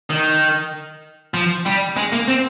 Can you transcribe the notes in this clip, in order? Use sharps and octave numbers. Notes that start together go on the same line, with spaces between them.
D#3
F3
G3
G#3
A#3
C4